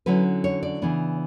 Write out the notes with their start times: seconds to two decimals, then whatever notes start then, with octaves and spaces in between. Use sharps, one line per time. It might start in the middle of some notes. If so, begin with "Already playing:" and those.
0.06 D3 F#3 C#4 E4 B4
0.44 C#5
0.63 D5
0.82 C#3 E3 B3 D4